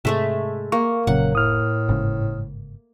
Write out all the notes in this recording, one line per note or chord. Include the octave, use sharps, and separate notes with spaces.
G#2 C3 G#3 A3 E5
A#3 C#6
F1 A#2 C#3 F#3 F#5
A2 D#6 F6
G1 G#2 C#3